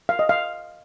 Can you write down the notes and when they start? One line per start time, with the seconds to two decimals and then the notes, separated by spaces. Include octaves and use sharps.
0.09 F5
0.19 D#5
0.29 F5